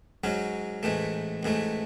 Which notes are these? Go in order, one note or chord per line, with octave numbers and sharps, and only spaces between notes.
G#2 F#3 C#4
A1 G#2 E3 A3
A1 G#2 E3 A3